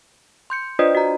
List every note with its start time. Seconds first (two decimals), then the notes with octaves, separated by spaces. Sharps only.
0.50 C6 G6 C#7
0.79 D4 F4 B4 C5 D5 D#5
0.95 F#4 A#5